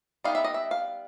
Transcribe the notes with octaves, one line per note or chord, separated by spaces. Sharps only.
G3 B3 D#4 F5
E5
D#5
E5
F5